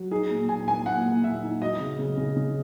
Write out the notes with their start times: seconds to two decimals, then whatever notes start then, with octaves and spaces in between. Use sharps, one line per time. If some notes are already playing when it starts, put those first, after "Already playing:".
Already playing: F#3
0.11 D#4 G#4
0.31 A#2
0.48 A#2 G#5
0.68 A#3 G#5
0.86 A#2 F#5
1.05 A#3
1.23 A#2 E5
1.43 D#4
1.61 F#3 D#5
1.80 C#3
1.99 C#3
2.17 C#3
2.36 C#3